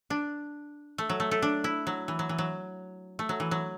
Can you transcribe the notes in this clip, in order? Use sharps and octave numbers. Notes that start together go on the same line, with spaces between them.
D4
A3
F#3
A3
A3
D4
E4
F#3
E3
F#3
E3
F#3
A3
F#3
E3
F#3